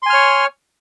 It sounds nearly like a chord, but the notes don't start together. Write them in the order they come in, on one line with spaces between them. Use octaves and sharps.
C6 G#5 F6 C#5